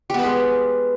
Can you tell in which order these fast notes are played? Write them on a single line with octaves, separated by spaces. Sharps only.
G4 B3 B4 G#3